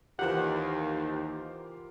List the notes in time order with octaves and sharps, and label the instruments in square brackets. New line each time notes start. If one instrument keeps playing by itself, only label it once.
[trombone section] D#2 [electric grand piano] E3 G4 [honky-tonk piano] F4 A#4 C5 [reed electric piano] F#5